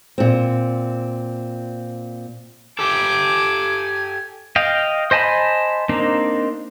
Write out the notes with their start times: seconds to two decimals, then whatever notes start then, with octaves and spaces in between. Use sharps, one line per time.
0.18 A#2 C4
2.79 G4 A4 G#5 D6
4.56 D#5 F5 G5
5.11 C5 D#5 G#5 A5 B5
5.89 A#3 C4 D4 D#4